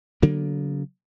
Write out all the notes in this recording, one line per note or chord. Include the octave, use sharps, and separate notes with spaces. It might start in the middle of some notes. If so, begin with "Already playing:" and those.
C#3 F#3 A#3 B3